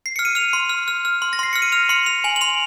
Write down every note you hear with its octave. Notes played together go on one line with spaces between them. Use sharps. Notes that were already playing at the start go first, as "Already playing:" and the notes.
C7
F6 C#7
D#7
F6 F7
C6
F6
F6
F6
C6
A#6
C6 C7
F6 C#7
D#7
F6 F7
C6 C#7
C6 F7
G#5 F#7
F#7
C6 F7